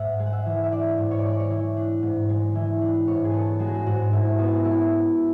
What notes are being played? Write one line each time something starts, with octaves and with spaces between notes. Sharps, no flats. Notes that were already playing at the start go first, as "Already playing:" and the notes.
Already playing: G#2 E5 F#5
G#3
F#5
E5
E3
E5
D4 D5
G#2
C#5
D5
G#3 C#5
D5
C#5
E3
D4
G#2
G#3
E3
D4
G#2 C#5
G#4
B3 A4
G#3 F#4
G#4
F#4
G#2 F#4
G#2 E4
B3 F#4
G#4
F#4
G#3 E4